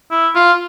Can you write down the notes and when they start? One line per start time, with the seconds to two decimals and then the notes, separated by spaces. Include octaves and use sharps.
0.11 E4
0.35 F4